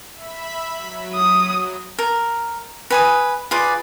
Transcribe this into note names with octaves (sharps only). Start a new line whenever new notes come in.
E5 B5 B6
F#3
D#6
A#4
B4 G#5 D#6
F4 G#4 B4 D5